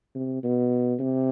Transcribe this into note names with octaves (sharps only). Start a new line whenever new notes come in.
C3
B2
C3